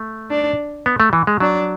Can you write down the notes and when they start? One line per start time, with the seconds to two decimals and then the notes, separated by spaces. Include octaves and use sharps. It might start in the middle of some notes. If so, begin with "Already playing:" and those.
Already playing: A3
0.31 D4
0.86 B3
1.00 A3
1.13 E3
1.27 G#3
1.40 F#3 D4